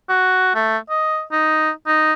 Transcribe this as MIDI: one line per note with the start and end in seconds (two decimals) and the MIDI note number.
0.09 0.54 66
0.55 0.78 57
0.90 1.22 75
1.32 1.70 63
1.87 2.13 63